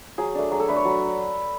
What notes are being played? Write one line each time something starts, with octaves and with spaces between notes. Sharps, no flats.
F#3 G#4
A3 D4
F#3 G#4
A4
A3 D4 B4
C#5
F#3